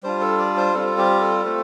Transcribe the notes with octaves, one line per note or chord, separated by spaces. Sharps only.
G3 D4 F4 C5
A4
D5
C5
G3 C4 F4 A4
G4
A4
A3 C4 F4